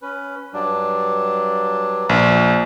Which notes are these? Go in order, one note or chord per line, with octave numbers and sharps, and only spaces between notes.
C#4 B4
G2 F#3 D4
A#1
G#4 G5